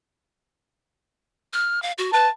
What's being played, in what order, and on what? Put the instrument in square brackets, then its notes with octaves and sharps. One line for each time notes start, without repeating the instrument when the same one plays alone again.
[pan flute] F6
F5
F#4
[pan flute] B4 [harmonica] A5